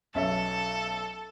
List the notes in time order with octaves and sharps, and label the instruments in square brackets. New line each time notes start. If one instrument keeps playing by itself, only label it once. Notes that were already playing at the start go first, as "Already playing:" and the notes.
[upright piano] B1 C#4 E5 [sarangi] A4